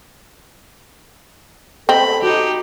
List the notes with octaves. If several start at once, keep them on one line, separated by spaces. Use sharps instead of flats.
C4 A4 D#5 B5
D#4 F#4 G4 D#5